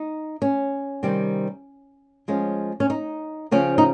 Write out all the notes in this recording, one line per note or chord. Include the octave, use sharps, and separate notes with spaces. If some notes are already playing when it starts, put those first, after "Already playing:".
Already playing: D#4
C#4
C3 D#3 G3 C4
F3 G#3 C#4
C#4
D#4
C#3 F3 C4 C#4
D#4